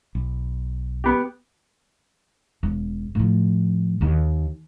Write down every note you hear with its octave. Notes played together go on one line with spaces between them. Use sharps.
B1
B3 G4
E1
A2 F3
D#2 D#3